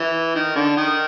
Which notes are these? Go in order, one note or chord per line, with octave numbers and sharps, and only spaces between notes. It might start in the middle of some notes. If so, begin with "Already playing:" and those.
Already playing: E3
D#3
D3
D#3